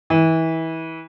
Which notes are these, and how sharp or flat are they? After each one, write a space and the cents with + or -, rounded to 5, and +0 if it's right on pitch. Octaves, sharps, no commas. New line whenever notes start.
E3 -25